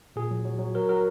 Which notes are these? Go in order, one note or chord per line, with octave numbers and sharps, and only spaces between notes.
A#2 G#4
F#3
F#3
F#3
F#3 A#4
F#3 A#4